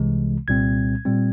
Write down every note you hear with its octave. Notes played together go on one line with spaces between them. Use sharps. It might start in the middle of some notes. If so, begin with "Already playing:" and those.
Already playing: C2 C3 E3 G#3
C2 A#2 G3 C4 G#6
A#2 G3 C4